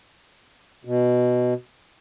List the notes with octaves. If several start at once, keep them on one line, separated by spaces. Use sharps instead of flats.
B2